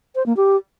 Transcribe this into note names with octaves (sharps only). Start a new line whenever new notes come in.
C5
A#3
G4